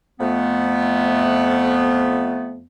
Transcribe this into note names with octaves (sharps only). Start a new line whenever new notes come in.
F2 A3 B3